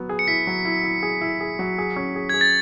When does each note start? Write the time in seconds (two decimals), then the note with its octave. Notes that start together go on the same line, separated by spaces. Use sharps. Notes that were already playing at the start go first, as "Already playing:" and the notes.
Already playing: F#3 B3
0.09 G#4
0.19 C#7
0.28 E4 B6
0.47 F#3
0.65 E4
0.84 E4
1.03 G#4
1.21 E4
1.41 G#4
1.59 F#3
1.78 G#4
1.96 C#4
2.16 G#4
2.29 G#4 G#6
2.41 A6